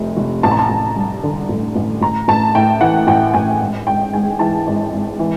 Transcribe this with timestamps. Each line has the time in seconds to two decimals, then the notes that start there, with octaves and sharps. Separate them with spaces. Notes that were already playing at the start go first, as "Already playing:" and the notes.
Already playing: F1 F2 C3
0.17 F1
0.43 A1 A5
0.51 A#5
0.59 A5
0.70 A1
0.96 G2
1.23 D3
1.49 A1
1.76 A1
2.01 A1 A#5
2.28 A1 A5
2.55 A2 G5
2.81 E3 F#5
3.07 A1 G5
3.34 A1 G#5
3.61 G#1
3.87 G#1 G5
4.13 G#2 G#5
4.39 E3 A5
4.67 G#1
4.93 G#1
5.19 E3